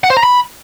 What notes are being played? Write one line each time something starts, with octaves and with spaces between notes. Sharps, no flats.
F#5
C5
A#5
B5